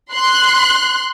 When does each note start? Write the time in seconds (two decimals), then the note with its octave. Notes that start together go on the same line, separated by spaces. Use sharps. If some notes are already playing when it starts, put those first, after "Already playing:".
0.12 C6 F#6